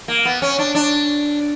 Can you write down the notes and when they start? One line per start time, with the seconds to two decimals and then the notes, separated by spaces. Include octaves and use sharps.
0.08 A#3
0.25 B3
0.42 C#4
0.59 D4
0.75 D4